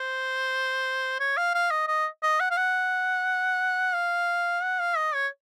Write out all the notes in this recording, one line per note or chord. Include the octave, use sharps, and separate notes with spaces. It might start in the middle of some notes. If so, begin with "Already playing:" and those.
Already playing: C5
C#5
F5
F5
D#5
D#5
D#5
F#5
F5
F#5
F5
F#5
F5
D#5
C#5